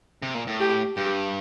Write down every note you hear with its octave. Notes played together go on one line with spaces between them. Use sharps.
C3
A#2
A2
G4
G2 G4